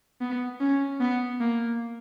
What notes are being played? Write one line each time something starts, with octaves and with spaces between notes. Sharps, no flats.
B3
C#4
B3
A#3